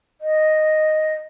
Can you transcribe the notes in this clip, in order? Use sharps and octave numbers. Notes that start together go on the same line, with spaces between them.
D#5